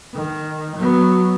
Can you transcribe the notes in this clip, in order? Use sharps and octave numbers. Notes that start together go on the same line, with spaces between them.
D#3
F#3 B3